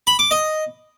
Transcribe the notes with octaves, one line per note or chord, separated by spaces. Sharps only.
B5
D6
D#5